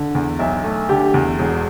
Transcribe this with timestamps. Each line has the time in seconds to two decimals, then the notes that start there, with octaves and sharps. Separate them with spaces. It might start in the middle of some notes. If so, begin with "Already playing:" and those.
Already playing: D3
0.15 E2
0.39 B1 E5
0.64 A3
0.89 D3 G4
1.14 E2
1.38 E1